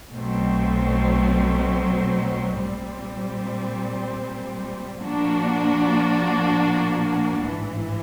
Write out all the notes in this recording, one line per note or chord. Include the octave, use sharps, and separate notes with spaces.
B1 B2 F#3 A3 C4
A#2 G3 C4
A#2 F3 A#3 D4 F#4
A1 G#2 E3